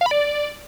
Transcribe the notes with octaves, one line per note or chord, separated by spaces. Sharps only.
F5
B5
D5